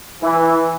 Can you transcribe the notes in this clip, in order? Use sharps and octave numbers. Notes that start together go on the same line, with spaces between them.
E3